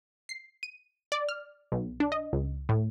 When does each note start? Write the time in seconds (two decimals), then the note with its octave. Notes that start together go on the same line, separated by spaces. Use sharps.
0.29 C7
0.63 D#7
1.12 D5
1.29 F6
1.72 B1
2.00 D4
2.12 D#5
2.33 C#2
2.69 A2